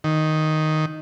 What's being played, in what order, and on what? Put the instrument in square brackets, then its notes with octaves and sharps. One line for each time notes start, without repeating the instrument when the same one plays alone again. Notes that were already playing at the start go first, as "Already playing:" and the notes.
[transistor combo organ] D#3